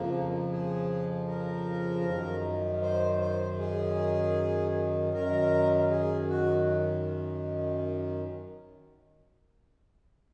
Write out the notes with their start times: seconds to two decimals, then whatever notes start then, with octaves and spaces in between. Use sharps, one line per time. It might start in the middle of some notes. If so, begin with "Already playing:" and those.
Already playing: F2 C#3 F3 A#3
0.51 G#4
1.28 A#4
2.05 F#2 D#3
2.82 C5
3.21 C5
3.59 G#4
5.13 F#2 D#3 A#4
5.91 G#4
6.29 F#4